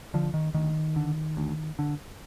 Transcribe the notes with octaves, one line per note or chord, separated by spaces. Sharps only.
D3 F3
D#3
D2 D#3
D3
D2
D3